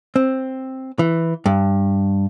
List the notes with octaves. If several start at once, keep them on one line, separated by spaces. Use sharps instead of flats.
C4
E3
G2